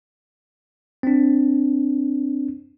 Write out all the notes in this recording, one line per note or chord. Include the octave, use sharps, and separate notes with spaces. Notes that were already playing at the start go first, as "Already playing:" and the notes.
C4 D4